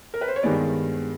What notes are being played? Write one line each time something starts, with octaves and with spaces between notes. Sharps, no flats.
A#4
B4
C5
C#5
G2 D#3 G#3 B3 D5